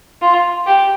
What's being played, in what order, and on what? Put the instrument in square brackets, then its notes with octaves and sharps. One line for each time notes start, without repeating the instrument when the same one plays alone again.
[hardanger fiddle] F4
G4